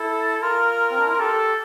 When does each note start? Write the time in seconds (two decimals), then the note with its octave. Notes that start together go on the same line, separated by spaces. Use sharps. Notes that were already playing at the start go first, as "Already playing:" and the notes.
Already playing: E4 A4
0.42 F4 A#4
0.91 C4
0.99 D4
1.05 E4
1.12 F4
1.19 G4 A4